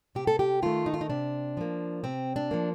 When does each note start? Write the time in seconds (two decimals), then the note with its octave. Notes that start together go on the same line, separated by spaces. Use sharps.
0.15 C3 G4
0.27 A4
0.39 G4
0.62 D#3 A3 F4
0.86 D#4
0.94 F4
1.01 D#4
1.10 C3 D4
1.57 F3 A#3
2.04 C3 C4
2.36 D4
2.51 F3 A#3